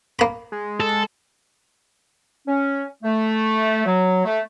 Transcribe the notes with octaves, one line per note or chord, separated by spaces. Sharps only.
A#3 B5
G#3
A4
C#4
A3
F#3
A3